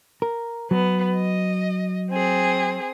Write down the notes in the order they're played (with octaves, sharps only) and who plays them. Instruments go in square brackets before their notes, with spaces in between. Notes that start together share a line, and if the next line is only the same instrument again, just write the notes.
[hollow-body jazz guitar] A#4
[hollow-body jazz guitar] F#3 [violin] B3
[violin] D#5
C4 G#4